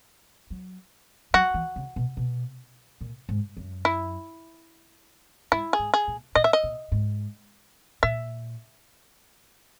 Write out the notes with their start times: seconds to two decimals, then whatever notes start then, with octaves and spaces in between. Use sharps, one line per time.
0.50 F#3
1.34 F#3 F#4
1.54 E3
1.76 C#3
1.96 B2
2.17 B2
3.01 A#2
3.29 G#2
3.57 F#2
3.85 E4
5.52 G#2 E4
5.73 G#4
5.79 G#2
5.94 G#4
6.08 A#2
6.35 A#2 D#5
6.44 E5
6.53 D#5
6.63 A#2
6.92 G#2
8.03 A#2 E5